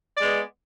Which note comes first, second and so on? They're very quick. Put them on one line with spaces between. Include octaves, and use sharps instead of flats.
D5 G#3 B3